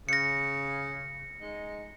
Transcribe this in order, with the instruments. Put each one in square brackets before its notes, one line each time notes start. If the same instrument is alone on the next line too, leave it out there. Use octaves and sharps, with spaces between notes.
[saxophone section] C#3 [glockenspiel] A#6 C#7
[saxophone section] G#3 D#4